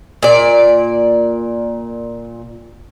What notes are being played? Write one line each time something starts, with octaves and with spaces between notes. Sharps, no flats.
A#2 D5